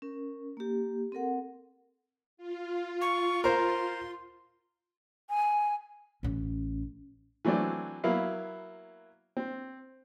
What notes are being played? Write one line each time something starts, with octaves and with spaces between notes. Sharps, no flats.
C#4 A#4
A#3 G4
C4 A4 A#4 F#5
F4
C#6
A#4 C5 C6
G#5
A1 C#4
E3 F#3 A3 C4 D4
F#3 A#3 B3 E4 F5
C4